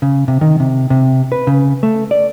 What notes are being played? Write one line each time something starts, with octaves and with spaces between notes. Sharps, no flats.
C#3
C3
D#3
C3
C3
B4
C#3
A3
D5